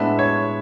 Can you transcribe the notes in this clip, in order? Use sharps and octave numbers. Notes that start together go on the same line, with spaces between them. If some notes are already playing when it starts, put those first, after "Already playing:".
Already playing: A2 G#3 B3 D4 E5
C#5